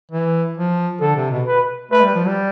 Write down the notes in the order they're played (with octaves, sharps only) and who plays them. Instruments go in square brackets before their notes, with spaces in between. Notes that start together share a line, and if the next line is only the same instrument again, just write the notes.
[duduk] E3
F3
[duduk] D3 [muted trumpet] A4
[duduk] C3
B2
[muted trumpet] B4
[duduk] A3 [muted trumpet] B4
[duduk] G3
F3
G3